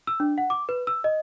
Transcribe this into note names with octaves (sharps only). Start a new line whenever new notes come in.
E6
D4
F#5
D6
B4
E6
D#5